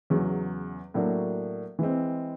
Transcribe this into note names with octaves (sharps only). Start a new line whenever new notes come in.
E2 C#3 F#3
A2 F#3 A#3 D4 F#4
E3 G#3 C4